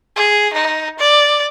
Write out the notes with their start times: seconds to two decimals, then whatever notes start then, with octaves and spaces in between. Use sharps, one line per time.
0.16 G#4
0.53 D#4
0.99 D5